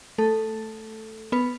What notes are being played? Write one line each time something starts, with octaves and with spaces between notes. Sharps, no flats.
A3 A4
B3 B4